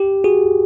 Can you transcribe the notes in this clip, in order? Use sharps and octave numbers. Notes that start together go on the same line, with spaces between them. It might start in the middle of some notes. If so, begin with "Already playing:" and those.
Already playing: G4
F#4 G#4